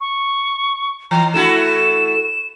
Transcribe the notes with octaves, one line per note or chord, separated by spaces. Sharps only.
C#6
E3 A#5
A3 E4 F#4 E7